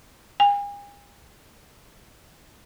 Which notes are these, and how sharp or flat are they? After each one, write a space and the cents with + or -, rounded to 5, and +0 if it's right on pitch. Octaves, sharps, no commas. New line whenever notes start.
G#5 -40